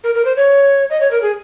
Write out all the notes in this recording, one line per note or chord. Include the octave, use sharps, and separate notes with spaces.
A#4
A#4
C5
C#5
D#5
C#5
A#4
G#4